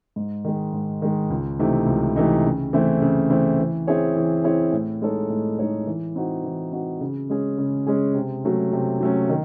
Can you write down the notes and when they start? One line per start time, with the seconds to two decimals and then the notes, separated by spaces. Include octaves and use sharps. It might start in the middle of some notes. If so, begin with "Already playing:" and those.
0.16 G#2
0.45 D#3 G#3
0.73 G#2
1.02 D#3 G#3
1.30 C#2
1.59 C3 E3 A3 D#4
1.87 C#2
2.16 C3 E3 A3 D#4
2.44 C#3
2.73 E3 A3 C4 E4
3.02 C#3
3.30 E3 A3 C4 E4
3.59 E3
3.87 C4 E4 G#4 C#5
4.16 E3
4.44 C4 E4 G#4 C#5
4.72 A2
5.02 G#3 D#4 A4 C#5
5.30 A2
5.59 G#3 D#4 A4 C#5
5.87 E3
6.16 C4 D#4 F#4
6.44 E3
6.72 C4 D#4 F#4
7.01 C#3
7.30 G#3 C#4 G#4
7.58 C#3
7.87 G#3 C#4 G#4
8.15 C3
8.44 F#3 A3 C#4
8.73 C3
9.01 F#3 A3 C#4
9.29 D#3